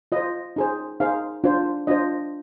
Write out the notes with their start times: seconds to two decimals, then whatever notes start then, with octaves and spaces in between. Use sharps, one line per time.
0.12 F4 C5 D#5
0.56 D#4 G#4 C5
1.00 D#4 G#4 C5 F5
1.44 D4 F4 C5
1.87 D4 F4 C5 D#5